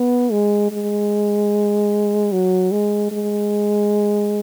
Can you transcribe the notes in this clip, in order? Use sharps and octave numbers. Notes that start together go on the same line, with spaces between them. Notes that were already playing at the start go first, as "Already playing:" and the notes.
Already playing: B3
G#3
G#3
F#3
G#3
G#3